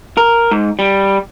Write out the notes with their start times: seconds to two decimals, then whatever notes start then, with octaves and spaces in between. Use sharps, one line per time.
0.17 A#4
0.51 G#2
0.79 G3